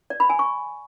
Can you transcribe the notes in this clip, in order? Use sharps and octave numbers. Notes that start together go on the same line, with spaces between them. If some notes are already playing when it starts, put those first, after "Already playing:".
D5
B5
G#5
C#6